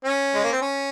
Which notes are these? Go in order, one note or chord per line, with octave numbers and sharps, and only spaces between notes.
C#4
G#3
A#3
C4
C#4